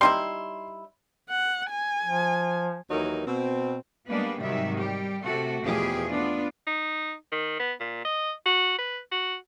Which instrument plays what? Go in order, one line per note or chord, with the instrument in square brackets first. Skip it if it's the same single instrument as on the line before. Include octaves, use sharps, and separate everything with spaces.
[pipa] G3 D#4 E4 [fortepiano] C6
[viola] F#5
G#5
[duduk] F3
[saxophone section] D#2 E3 F#3 D#4 A#4
B2 C4
[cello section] G3 G#3 A#3 B3 D4 B4
G#2 C3 D#3 F#3 G3 E5
G3 G4
C3 A3 F#4 A4
E2 B2 F3 A3 G4 G#4
B3 D4 F4
[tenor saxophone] D#4
D#3
B3
A#2
D#5
F#4
B4
F#4